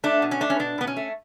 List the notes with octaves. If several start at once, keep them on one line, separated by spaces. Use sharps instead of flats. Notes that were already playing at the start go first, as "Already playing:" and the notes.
A3 D4
B2
C#4
A3 D4
C#4
B2 D4
B2 B3
C#4
A3